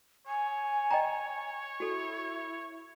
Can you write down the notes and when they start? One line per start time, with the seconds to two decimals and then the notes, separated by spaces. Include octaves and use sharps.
0.27 C#5 G#5
0.91 D#5 G5 A#5
1.80 E4 F#4 A4